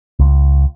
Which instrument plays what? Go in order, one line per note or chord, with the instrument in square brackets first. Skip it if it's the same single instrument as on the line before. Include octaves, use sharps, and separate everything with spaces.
[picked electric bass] C#2